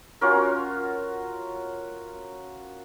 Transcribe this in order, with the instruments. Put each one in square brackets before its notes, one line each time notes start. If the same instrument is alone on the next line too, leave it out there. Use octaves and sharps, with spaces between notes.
[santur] C#4 F4 F#4 A#4